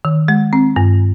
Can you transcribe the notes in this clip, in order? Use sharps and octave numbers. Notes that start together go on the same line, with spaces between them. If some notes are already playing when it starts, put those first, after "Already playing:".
D#3
G#3
C4
G2